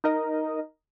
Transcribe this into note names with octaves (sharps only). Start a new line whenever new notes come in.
D#4 A#4 D#5